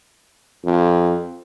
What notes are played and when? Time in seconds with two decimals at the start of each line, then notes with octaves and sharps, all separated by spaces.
0.65 F2